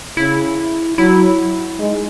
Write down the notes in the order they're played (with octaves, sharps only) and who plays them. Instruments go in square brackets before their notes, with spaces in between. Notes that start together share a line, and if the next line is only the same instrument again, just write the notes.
[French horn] C#3 [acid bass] E4
[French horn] F#3 [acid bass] E4
[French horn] G#3 [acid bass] D#4